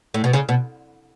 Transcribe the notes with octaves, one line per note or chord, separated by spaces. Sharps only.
A2
B2
C#3
B2